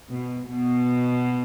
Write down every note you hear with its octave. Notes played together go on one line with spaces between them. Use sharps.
B2
B2